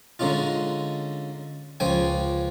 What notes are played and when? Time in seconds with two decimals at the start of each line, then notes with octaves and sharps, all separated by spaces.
0.19 D3 G#3 C#4 D#4 F4
1.80 C#2 F3 C#5 G5 G#5